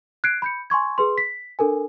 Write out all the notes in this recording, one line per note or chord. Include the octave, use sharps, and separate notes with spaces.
F#6 G#6 C7 D7
B5 G6 C#7
G#5 C6 C#6 G#6
G#4 B4 C6
B6
D4 A4 A#4 G#5